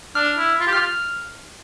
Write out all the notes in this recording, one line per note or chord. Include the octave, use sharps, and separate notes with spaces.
D4 F6
E4
F4
G4
F4 F6